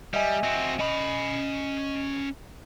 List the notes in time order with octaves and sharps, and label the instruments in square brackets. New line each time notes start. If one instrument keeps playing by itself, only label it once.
[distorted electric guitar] G3 [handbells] D#5 E5 G#5
[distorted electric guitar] C4 F#4
[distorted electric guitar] C#4 B5 [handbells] D#5